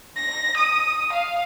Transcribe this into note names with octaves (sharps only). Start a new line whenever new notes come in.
A#6
D#6
F5